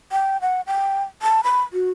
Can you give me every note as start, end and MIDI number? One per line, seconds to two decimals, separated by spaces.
0.12 0.40 79
0.42 0.61 78
0.67 1.02 79
1.22 1.41 81
1.44 1.62 83
1.73 1.91 66